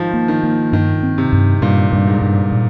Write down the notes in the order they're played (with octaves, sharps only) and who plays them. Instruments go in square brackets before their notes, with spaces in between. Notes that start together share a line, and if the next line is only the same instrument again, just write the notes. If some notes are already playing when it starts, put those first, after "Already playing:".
Already playing: [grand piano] G#2 D#3 F3
[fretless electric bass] A#3
[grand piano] D#3
[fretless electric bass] A#3
[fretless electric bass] G2 [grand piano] D#3
[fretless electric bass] C4
[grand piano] C3
[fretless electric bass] G2
[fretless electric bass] G2 [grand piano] A#2
[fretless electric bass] G2
[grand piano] G#2
[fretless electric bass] G2
A#2